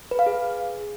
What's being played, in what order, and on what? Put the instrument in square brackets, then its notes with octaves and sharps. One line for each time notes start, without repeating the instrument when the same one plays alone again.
[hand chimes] B4
F5
G#4